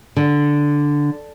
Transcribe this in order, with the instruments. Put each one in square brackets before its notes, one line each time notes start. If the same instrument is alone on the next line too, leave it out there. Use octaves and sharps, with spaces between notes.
[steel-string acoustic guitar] D3